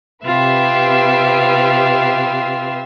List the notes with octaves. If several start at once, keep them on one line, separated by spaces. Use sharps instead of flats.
C3 F4 G4 B4 E5 C7